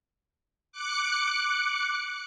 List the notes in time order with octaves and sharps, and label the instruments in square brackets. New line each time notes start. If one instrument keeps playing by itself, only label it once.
[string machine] D6 F#6 C#7